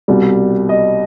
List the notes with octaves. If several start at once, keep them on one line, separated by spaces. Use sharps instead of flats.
C2 B2 G3
D#5